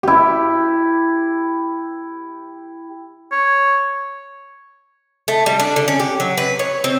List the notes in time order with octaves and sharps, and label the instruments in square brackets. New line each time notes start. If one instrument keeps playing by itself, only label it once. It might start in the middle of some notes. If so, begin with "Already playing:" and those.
[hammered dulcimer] E4 G4
[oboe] C#5
[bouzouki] A3
G3
D4
D3
C#4
G4
F#3
B4
C#5
C4